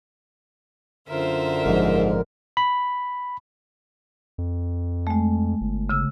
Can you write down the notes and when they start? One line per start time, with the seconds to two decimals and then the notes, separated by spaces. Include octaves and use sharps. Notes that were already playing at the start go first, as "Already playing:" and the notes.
1.09 F#2 D3 F4 A#4 C5 E5
1.66 G#1 G#2 F3
2.57 B5
4.38 F2
5.07 G#3 A3
5.61 G1
5.89 C#3 E6